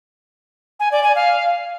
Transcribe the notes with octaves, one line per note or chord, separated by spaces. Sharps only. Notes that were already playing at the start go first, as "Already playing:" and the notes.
G#5
D5
G#5
F5